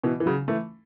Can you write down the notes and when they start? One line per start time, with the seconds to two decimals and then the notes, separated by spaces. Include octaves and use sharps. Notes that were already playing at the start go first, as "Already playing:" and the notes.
0.03 B2 E3
0.20 E3
0.26 C#3 F#3
0.48 E3 A3